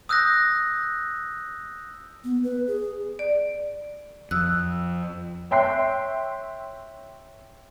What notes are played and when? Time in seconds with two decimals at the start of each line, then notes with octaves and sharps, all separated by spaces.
0.09 D#6 E6 F#6 G6 A#6
2.24 B3
2.44 B4
2.67 G#4
3.19 D5
4.31 F2 D#6 E6 F#6
5.51 C#5 E5 G5 C6 F#6 C7